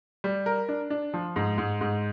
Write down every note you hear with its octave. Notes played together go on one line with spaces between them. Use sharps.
G3
A#4
D4
D4
F3
G#2
G#2
G#2